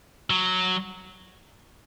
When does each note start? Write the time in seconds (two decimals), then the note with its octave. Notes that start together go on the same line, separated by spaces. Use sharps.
0.30 F#3